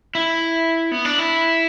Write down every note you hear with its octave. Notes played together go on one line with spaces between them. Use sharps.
E4
B3
D4
E4